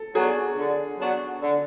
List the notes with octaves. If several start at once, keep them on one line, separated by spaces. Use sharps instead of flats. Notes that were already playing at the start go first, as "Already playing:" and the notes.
Already playing: A4
F#3 B3 D4 F#4 G#4
D3
F#3 B3 D4 F#4
D3